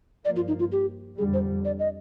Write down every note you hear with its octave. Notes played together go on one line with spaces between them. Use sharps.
G2 F3 A#3 D5
F4
D#4
F4
G4
F2 D3 G3 G#4
C5
D5
D#5